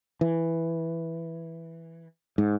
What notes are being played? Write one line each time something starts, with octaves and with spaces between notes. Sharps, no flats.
E3
G#2